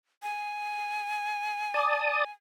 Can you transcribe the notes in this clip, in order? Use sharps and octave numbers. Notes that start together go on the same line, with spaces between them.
G#5
D5 A5 D#6